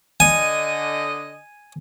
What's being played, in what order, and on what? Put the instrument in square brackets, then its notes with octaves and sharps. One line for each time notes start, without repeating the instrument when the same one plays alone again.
[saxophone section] D3 D#5 [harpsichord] G#5